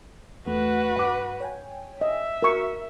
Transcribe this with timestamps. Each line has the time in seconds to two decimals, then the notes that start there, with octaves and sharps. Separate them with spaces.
0.47 E2 A3 F#4 B4
0.96 G2 F#5 D6
1.40 C#5 G5 G#5
2.01 D#5 E5
2.42 F#4 A#4 C#6